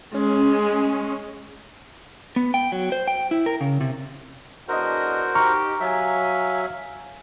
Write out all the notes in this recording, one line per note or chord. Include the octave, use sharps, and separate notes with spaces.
G#3 C#4
B3
G5
F#3
C5
G5
E4
A#4
C#3
C3
E2 D4 F#4 A#4 C5 D#5
D#4 G4 A#5 C#6 F6
F#3 E5 F5 G#5